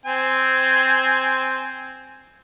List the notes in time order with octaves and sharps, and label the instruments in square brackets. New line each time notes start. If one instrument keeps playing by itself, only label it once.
[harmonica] C4 G#5